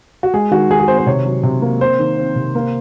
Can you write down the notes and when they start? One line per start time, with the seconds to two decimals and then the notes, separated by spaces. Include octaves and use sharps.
0.23 F#4
0.34 G#3 G#4
0.51 D#3 F#4
0.70 D#3 G#4
0.80 G#4
0.88 C4 C5
0.98 C5
1.06 C3 C#5
1.26 F#3
1.43 C3
1.62 A#3
1.81 C4 C5
1.99 D#3
2.18 C4
2.36 C3
2.55 A#3